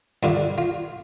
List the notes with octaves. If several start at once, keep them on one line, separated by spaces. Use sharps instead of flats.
G2 D3 F4
F4